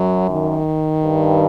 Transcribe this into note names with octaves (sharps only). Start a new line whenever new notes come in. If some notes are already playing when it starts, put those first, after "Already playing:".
Already playing: F#2 F#3
D#3
G2